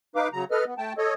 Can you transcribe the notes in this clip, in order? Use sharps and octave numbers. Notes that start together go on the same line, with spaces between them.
D#4 B4 F5 D6
C#3 F#3 A#5
A4 B4 D#5 F6
B3
A3 G5 A5
A4 C#5 D#5